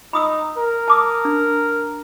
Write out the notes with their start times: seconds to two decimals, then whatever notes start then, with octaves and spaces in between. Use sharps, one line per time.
0.13 D#4 B5 D#6 E6
0.58 A#4
0.88 A5 D6 D#6
1.25 D4